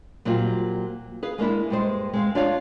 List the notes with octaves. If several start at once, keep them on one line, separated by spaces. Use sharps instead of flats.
A#2 F#3 G3 A#3 C4 F4
G#4 B4 F5
G#3 A#3 D4 E4
G2 G#3 C5
G#3 C4 F5
D4 F4 C#5 D5 F5